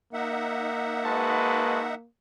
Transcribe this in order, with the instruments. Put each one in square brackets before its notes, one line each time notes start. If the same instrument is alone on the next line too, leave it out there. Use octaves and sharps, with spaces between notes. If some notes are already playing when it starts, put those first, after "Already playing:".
[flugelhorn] A#3 [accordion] D#4 E5 F#5
[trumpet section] G#3 F#4 B4 [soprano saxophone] A5